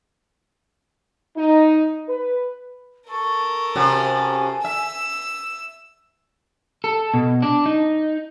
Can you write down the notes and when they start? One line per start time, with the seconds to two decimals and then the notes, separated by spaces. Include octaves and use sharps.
1.37 D#4
2.09 B4
3.10 A4 A#4 C#6
3.75 C3 C#4 F#4 G#5
4.64 E5 E6
6.84 A4
7.14 B2
7.42 D4
7.66 D#4